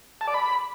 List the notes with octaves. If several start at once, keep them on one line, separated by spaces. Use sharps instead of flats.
A5
D5
B5